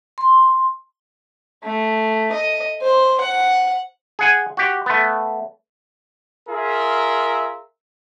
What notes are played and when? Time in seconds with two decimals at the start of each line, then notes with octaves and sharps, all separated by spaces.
0.18 C6
1.64 A3
2.33 D#5
2.82 C5
3.20 F#5
4.19 G#4 F#5 G#5
4.57 F#4 G4
4.86 A3 B3
6.49 F4 G#4 A#4 E5